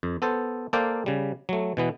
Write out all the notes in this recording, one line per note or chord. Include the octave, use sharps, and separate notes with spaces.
F2
B3 A4 C5
A#3 A4 C5 D5 F5 G5
C#3 G3
F#3 A3
B2 E3 B3